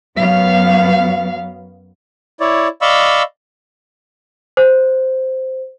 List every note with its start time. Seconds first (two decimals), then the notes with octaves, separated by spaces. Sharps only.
0.17 F#2 F#3 B3 F5
2.40 E4 C#5 D5
2.82 D5 D#5 F5 B5 C#6 E6
4.57 C5